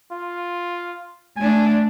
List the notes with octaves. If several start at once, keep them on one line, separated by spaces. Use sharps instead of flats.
F4
A3 D4 G#5